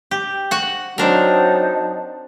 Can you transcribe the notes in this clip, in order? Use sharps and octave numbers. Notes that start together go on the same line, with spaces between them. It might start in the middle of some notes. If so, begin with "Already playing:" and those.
G4
F#4 F#5
F#3 C4 D4 D#4 A#4 A5